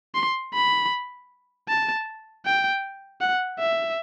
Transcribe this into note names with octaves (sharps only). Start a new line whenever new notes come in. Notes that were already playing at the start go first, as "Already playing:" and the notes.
C6
B5
A5
G5
F#5
E5